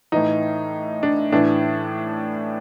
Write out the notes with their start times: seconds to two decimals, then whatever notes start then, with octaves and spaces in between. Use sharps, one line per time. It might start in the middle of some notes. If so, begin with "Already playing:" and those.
0.12 A2 E3 D#4
1.03 D4
1.32 A2 E3 D4